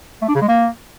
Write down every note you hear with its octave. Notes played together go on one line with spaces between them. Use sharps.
A3
D4
C#3
G#3
A#3